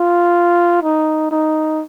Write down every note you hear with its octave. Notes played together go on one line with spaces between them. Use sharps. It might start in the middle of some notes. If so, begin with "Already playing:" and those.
Already playing: F4
D#4
D#4